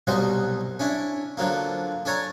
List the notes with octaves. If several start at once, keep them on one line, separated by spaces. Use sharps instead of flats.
C2 B2 F#3 G3 C5 D#5
C#4 D4 E4
D3 F3 F#3 A#3
D4 A4 C#5 G#5 A#5